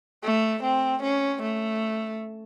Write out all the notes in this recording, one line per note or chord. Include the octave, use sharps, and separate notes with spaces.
A3
C4
C#4
A3